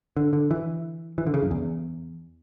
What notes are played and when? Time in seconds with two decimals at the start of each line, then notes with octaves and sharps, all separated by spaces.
0.17 D3
0.33 D3
0.51 E3
1.18 E3
1.27 D3
1.34 C#3
1.43 F#2
1.51 E2